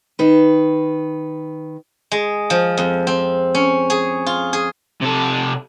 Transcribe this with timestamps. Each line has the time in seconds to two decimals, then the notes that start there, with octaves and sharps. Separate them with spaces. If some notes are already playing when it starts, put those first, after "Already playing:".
0.19 D#3 B4
2.11 G#3
2.50 F3
2.77 F2
3.07 C4
3.55 C#4
3.90 G#4
4.26 F4
4.53 G#4
5.02 C3 A4